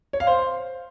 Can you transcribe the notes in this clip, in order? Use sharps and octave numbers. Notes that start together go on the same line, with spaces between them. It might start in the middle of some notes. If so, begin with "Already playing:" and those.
C#5
F5
C5